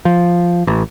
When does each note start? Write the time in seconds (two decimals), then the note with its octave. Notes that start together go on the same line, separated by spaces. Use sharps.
0.05 F3
0.67 A1